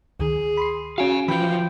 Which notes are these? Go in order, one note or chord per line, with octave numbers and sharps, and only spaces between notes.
D2 D#3 G#4
B5 C6 C7
C#4 F#4 F5 G#5
E3 F3 G5 B5 G6